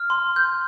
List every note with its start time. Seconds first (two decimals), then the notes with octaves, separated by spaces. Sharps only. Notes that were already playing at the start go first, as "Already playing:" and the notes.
Already playing: F6
0.10 C6
0.36 G6